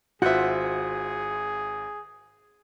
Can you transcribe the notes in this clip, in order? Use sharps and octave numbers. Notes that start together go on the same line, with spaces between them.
G#1 F4 F#4 G#4 C5 E5 F#5 G6